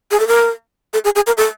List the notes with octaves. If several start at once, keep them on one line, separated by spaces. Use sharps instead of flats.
G#4
A4
A#4
A4
G#4
G#4
A#4
A4